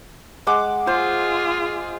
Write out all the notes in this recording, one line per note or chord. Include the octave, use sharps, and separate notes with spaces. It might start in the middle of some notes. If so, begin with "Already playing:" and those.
G#3 F#5 D6
F4 G#4 C5